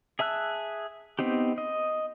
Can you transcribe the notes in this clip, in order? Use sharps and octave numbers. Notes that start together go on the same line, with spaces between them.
G#4 E5 A5 E6 F#6
B3 C4 D#4 G4
D#5